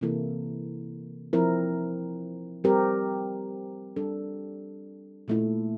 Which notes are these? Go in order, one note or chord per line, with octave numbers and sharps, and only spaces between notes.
C3 E3 A#3 E4 A4
F3 C4 E4 A#4
G3 C4 G4 A#4
G3 D4 A4
A#2 A3 E4